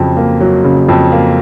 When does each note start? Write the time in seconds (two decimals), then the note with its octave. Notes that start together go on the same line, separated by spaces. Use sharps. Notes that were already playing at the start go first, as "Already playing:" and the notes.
Already playing: F2 C#3 F#3
0.17 A#3
0.40 F#3
0.64 C#3
0.88 F2
1.12 A#3